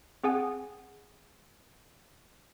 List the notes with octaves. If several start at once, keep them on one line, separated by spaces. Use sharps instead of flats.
C4 G#4 F#5 G#5